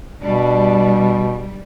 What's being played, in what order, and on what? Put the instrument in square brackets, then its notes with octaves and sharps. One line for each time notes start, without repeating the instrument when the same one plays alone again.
[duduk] B2 [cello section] G3 [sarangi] D4